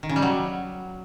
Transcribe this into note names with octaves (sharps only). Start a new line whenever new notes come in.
D#3
C#3
G3
F#3